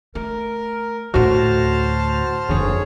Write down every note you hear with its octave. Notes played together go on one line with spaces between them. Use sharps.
A3 A#4
D2 A2 F#4 C5 A5 F6
F1 D3 G#4 C#5